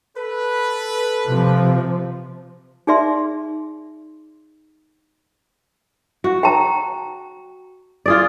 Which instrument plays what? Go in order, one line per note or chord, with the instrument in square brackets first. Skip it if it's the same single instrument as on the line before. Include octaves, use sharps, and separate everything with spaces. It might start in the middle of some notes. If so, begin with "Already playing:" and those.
[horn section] A4 B4
[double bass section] C3 F3
[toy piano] D#4 G#4 D5 E5 C6
[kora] F#4
[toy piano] G5 A5 A#5
[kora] F4 G#4 D5